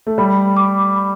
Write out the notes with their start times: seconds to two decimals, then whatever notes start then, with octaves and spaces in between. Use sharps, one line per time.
0.07 A3
0.18 G3 B5
0.57 D6
0.96 B5